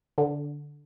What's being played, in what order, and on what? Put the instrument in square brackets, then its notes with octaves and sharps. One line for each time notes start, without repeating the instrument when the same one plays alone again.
[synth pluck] D3